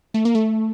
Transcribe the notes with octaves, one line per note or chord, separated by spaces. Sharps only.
A3
A#3
A3